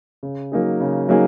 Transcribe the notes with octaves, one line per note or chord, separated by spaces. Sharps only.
C#3
F#3 A#3 D#4 G#4
C#3
F#3 A#3 D#4 G#4